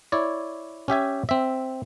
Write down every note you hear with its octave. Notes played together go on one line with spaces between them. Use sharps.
E4 C#5 D5
C#4 G4 E5 G#5
C4 E5